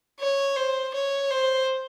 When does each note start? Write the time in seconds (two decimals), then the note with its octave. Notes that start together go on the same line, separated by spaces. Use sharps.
0.19 C#5
0.56 C5
0.94 C#5
1.30 C5